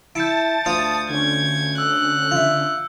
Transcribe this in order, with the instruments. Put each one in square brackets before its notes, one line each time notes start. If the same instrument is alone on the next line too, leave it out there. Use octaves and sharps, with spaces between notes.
[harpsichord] E4 [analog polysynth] A5 A6 [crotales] G6 C#7 D7
[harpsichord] D2 F4 F5 [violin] D#6
[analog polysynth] D3 C#4 [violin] G#6
[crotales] E6 [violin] F#6
[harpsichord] F4 E5